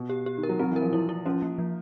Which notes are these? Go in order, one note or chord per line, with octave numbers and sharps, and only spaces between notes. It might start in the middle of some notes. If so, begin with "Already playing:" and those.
Already playing: B2
G4
G4
D#3
A#4
F#3
F#3 C4
E3 A#4
F3
F3 E4
E4
F3 C#4
A#3
F3